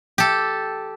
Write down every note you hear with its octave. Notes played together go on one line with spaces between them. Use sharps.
G4 A4